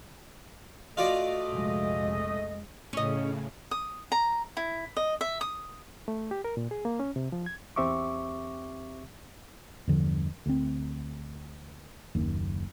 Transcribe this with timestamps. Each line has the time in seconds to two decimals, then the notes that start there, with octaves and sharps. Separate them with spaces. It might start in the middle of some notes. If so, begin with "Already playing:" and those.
0.97 A3 F4 F#4 D5 D#5
1.49 F1 A#1 G#3
2.93 A2 C#3 C#4 D#5
3.71 D#6
4.12 A#5
4.57 E4
4.97 D#5
5.21 E5
5.41 D#6
6.08 A3
6.31 G4
6.45 A#4
6.57 A#2
6.71 G#4
6.85 A#3
7.00 C#4
7.16 C3
7.32 F3
7.46 G#6
7.76 E2 C4 G4 E5 C#6 D6
9.88 E2 G2 D3 F3
10.46 D2 C4
12.15 F#1 D#2